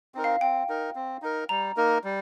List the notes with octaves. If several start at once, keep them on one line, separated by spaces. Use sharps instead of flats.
C4 D#4 A#4
F5
C4 G5
D#4 A#4
C4
D#4 A#4
G3 A#5
A#3 D#4 A#4
G3